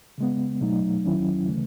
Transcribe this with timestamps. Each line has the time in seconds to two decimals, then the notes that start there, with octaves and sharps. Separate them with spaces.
0.18 C#3 G#3 B3
0.61 B2 F#3 A3 D#4
1.05 D#2 D#3 F#3 C#4 E4
1.48 C#3 E3 A3